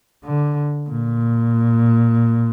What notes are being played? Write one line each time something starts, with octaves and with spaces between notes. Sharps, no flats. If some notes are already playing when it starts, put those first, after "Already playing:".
D3
A#2